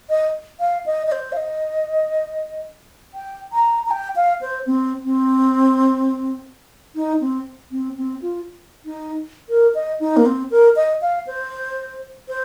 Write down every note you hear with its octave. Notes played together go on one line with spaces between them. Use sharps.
D#5
F5
D#5
D#5
C5
F5
D#5
G5
A#5
A#5
G5
F5
C5
C4
C4
D#4
C4
C4
C4
F4
D#4
A#4
D#5
D#4
A#3
C4
A#4
D#5
F5
C5
C5